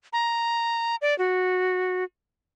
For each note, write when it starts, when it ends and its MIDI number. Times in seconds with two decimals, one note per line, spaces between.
0.13 0.96 82
1.02 1.17 74
1.18 2.04 66